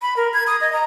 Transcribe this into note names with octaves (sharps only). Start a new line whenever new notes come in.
B5
A#4
G#6
D#6
D#5
A#5